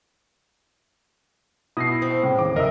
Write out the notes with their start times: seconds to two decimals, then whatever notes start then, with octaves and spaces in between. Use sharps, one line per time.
1.77 B2 E4 D#6 A#6 C7
2.02 C4
2.23 A2 C#3
2.39 D#2 D6
2.56 F#1 A#4 D#5 E5 E6